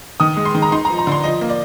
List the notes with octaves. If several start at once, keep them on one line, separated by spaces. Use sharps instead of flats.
D#3 D#6
G#3
C6
D#3
A#5
D#4 C6
A#5
F3
A#5
D3 C6
F3 D#5
A#3
D5